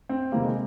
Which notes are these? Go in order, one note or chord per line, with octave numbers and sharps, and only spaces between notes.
C4
C3 D#3 G3 A#3
G#3